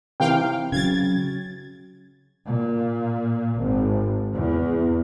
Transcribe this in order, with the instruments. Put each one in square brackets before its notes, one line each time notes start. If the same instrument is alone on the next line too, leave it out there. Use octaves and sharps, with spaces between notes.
[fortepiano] C3 E3 [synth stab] F5 G5
[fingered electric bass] C#3 F#3 [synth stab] G#6 A6
[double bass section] A#2
G#1
E2